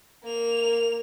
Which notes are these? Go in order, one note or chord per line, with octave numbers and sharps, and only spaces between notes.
A#3 F7